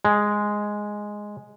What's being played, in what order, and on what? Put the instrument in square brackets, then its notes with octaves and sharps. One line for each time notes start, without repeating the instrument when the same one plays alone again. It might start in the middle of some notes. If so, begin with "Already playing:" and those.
[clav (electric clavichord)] G#3